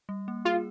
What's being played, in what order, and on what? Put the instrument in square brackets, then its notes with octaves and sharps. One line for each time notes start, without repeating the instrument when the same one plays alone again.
[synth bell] G3
A#3
[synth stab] F4 [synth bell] G#4